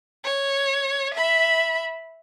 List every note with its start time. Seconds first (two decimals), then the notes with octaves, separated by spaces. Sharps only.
0.24 C#5
1.14 E5 B5